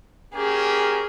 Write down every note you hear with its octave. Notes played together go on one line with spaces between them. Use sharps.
A#3 C#4 G4 G#4 A#4